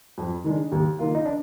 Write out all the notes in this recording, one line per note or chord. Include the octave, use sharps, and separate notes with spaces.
F2
D#3 G#3 D4
D#2
D#3 A#3 F4
D#4
D4